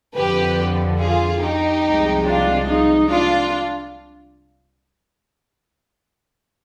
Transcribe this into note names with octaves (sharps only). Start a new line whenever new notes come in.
F2 D3 F3 G4 B4
F4 G#4
D#4 G4
C2 C3 F3 G#3
D4 F4
D#4
D4 F4